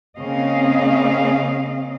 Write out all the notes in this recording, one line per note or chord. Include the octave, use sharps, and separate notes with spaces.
C#3 A#3 C4 C#4 D#5 F5